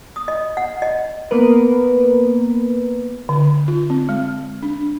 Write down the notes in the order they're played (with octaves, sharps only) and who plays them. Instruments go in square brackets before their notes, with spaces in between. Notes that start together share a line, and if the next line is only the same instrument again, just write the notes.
[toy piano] D#6
D#5
F#5
D#5
[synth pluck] A#3 B3 A#4 B4
[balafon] D3
F4
C4
G#3
D4